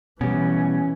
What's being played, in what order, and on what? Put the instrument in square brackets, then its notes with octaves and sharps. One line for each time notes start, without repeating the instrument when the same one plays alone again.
[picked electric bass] B2 G3 [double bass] E3 [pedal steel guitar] C#4